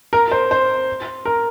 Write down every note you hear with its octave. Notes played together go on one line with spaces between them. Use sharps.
A#4
C5
C5
A#4